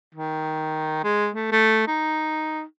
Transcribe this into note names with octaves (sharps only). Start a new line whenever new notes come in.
D#3
G#3
A3
A3
D#4